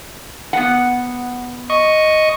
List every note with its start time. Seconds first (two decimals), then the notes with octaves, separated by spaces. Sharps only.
0.53 B3 F#5
1.70 D#5 C#6